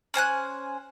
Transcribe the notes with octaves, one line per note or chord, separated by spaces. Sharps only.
C#4 C5 G#5 F#6